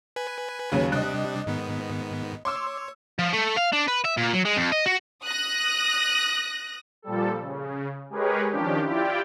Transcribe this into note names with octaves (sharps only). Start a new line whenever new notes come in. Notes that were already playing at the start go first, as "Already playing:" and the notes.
B4 G#5
D#2 C#3 F#3
C3 G3 D4 D#5 F#6
G#2 D#3 B3
C#5 C6 D6 E6
F3
A3
F5
D4
B4
E5
A#2
F#3
G#3
F2
D#5
F#4
D#6 F#6 A#6
A#2 F3 G3 A4
C#3
G#3 G4 G#4 A#4 B4 C#5
D#3 F3 C#4 D4 G4
E4 F4 G4 D5 G5